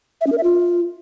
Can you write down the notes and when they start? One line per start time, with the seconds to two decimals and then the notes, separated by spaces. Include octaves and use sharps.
0.21 E5
0.27 C#4
0.32 A#4
0.38 E5
0.43 F4